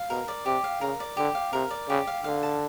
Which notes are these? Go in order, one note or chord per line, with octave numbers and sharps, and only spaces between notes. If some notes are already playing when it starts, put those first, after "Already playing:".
Already playing: F5
B2 A#4
D5
C3 G4
F5
C#3 A#4
D5
D3 G4
F5
C3 A#4
D5
C#3 G4
F5
D3 F5
A5